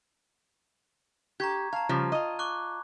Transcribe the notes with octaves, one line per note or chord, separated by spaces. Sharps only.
G4 A#5 C#6 G#6
F5 A5 A#5
C#3 F3 G3
F4 D#5
C#6 D6 F#6